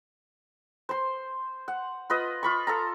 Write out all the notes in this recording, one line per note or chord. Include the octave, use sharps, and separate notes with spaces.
C5 C6
F#5
F4 B4 D#5
F4 B5 C#6
A4 F5 A#5